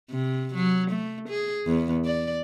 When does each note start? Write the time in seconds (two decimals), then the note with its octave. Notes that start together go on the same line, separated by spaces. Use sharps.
0.10 C3
0.55 F#3
0.91 A3
1.29 G#4
1.67 E2
2.05 D5